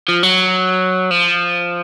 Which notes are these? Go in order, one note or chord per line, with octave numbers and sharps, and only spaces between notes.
F3
F#3
F3